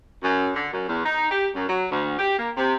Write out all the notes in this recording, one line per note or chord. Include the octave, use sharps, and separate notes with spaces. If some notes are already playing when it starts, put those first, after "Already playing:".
F#2
D3
F#2
E2
D#4
G4
F#2
F#3
D2
G4
A#3
C3